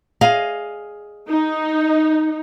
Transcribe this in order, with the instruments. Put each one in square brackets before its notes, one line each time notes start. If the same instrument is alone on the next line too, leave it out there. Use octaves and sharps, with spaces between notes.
[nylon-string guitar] G#4 D#5 F5
[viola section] D#4